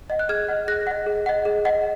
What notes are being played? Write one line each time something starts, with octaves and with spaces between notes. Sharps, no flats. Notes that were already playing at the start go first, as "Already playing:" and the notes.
D#5 F#5
F#6
G#4 F6 G#6
D#5 F#5
G#4 F#6 A#6
D#5 F#5
G#4
D#5 F#5
G#4
D#5 F#5